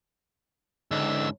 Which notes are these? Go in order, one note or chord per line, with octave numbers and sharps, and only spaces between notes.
C#2 G#2 D3 E6